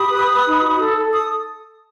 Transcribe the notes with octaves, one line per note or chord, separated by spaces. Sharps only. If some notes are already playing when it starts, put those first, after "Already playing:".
Already playing: G4 B5 D#6
B4
B4
D#4
F#4
A4
A4
D#6